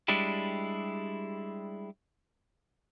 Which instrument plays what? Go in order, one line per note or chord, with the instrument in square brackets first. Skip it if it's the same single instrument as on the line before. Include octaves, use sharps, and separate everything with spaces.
[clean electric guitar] G3 G#3 D4 E4 G4